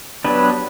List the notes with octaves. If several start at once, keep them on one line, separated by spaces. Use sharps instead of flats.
F#3 B3 D4 G4 B4